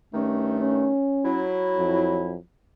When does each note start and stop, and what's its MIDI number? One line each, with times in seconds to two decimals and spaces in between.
0.14 0.91 43
0.14 0.91 51
0.14 0.91 57
0.14 0.57 61
0.61 1.43 61
1.25 2.38 54
1.25 2.38 64
1.78 2.37 41